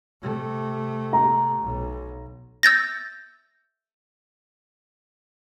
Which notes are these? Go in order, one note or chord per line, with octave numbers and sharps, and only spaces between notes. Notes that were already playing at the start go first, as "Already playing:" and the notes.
C3 A3
A#5
B1
E6 G6 A6 A#6